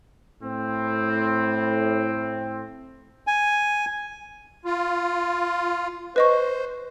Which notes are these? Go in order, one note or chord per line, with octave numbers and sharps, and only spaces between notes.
A2 C4
G#5
F4
B4 C5 D#5 C#6